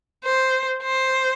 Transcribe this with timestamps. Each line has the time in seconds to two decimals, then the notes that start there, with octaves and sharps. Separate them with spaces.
0.24 C5
0.83 C5